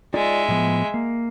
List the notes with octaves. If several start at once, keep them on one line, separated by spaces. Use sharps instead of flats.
G#3 D#4 F4 D5 E5
A2 F3 B3
A#3